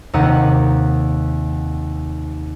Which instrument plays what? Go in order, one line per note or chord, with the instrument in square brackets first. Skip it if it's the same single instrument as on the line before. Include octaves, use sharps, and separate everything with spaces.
[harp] D#2 C3 D#4 D#5 F#5